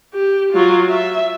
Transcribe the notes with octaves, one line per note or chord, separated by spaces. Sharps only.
G4
F#3 F4
E5